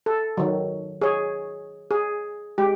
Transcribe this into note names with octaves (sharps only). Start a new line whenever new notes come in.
A4
D#3 F#3
G#4 C#5
G#4
G#3 G4